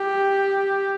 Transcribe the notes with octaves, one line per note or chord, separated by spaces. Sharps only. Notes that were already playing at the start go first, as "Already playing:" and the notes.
Already playing: G4